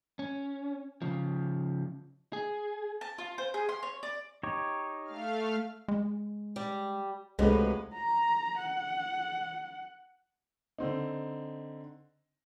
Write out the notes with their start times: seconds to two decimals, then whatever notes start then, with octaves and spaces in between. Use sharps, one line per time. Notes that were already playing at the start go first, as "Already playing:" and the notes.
0.19 C#4
1.02 C#3 F3
2.33 G#4
3.01 A5
3.18 F4
3.38 C5
3.54 G#4
3.69 C6
3.83 C#5
4.03 D5
4.43 D#4 G4 C#5
5.05 A3 F5 F6
5.88 G#3
6.56 G3
7.39 C#2 C3 F3 F#3 G#3 A3 B4
7.93 A#5
8.58 F#5
10.78 D3 C4 D#4